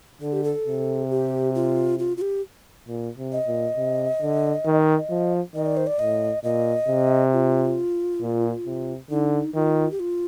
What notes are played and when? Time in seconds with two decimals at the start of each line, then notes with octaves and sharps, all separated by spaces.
0.21 D3 A4
0.33 G4
0.44 A4
0.66 C3
1.10 G4
1.55 F4
1.99 F4
2.17 F4
2.21 G4
2.88 A#2
3.18 C3
3.33 D#5
3.47 A#2
3.77 C3
4.22 D3
4.65 D#3
5.10 F3
5.55 D#3 D#5
5.66 D5
5.77 C5
5.87 D5
5.99 A2 D#5
6.44 A#2 D#5
6.88 C3
7.33 F4
8.22 A#2
8.66 C3
9.10 D3 D#4
9.55 D#3 F4
9.91 G4
10.00 F4